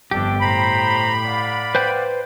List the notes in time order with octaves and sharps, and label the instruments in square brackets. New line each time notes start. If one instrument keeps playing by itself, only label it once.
[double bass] G1 F2 [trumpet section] A3 D4 D5 [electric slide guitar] G4
[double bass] A2 [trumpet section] C5 A#5 [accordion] B5
[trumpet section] D5 F5 F#5
[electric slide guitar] B4 C5 G5